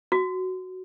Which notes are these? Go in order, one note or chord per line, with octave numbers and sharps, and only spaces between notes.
F#4